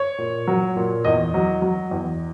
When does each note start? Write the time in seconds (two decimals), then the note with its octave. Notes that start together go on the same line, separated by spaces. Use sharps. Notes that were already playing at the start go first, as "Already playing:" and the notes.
Already playing: C#5
0.18 A#2
0.47 F#3
0.76 A#2
1.05 E2 D#5
1.34 F#3
1.62 F#3
1.91 E2